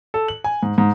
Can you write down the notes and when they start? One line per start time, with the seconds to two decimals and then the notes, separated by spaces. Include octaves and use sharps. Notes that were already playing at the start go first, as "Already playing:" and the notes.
0.14 A4
0.28 F#7
0.44 G#5
0.63 G#2
0.78 G#2